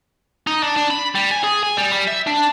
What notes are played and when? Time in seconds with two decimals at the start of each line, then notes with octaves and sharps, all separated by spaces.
0.47 D#4
0.63 D4
0.76 D4
0.90 B5
1.15 G3
1.31 G#5
1.44 G#4
1.63 G#5
1.77 G3
1.92 G3
2.07 E5
2.27 D4